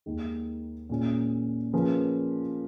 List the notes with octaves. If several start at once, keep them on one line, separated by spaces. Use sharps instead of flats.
D#2 D#3 G#3
A#2 G#3 C#4
F3 A#3 C#4 G#4 B4